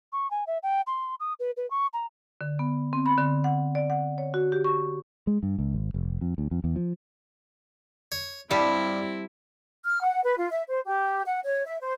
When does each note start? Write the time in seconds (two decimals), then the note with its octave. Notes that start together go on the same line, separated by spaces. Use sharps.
0.13 C#6
0.31 G#5
0.47 E5
0.63 G5
0.87 C6
1.20 D#6
1.40 B4
1.57 B4
1.71 C#6
1.94 A#5
2.41 D3
2.59 B3
2.93 C4
3.06 B5
3.17 D3
3.44 F#5
3.75 D5
3.90 F#5
4.18 C#5
4.34 F#4
4.52 G4
4.64 C#6
5.27 G#3
5.43 G2
5.59 C#2
5.74 G#1
5.94 F1
6.21 F2
6.38 D2
6.51 F2
6.64 E2
6.76 F3
8.12 C#5
8.51 G2 G3 C4 E4 A5 B5 D6
9.84 F6
10.02 F#5
10.24 B4
10.37 F4
10.51 E5
10.70 C5
10.86 G4
11.26 F#5
11.44 C#5
11.66 E5
11.81 C5